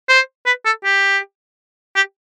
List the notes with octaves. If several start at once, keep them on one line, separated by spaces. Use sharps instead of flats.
C5
B4
A4
G4
G4